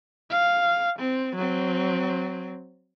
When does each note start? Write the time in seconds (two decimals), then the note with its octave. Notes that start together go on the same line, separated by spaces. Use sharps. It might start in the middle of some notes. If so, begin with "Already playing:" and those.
0.31 F5
0.99 C4
1.35 F#3 C4